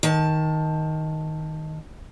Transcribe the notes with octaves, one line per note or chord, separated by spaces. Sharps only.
D#3 A5